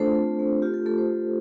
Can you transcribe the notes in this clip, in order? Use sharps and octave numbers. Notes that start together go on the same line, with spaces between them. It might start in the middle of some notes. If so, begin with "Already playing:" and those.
Already playing: A3 D4 F4 A4 C5
C4 A4
A3
F4 G4
A4
A3 A4
C5
A3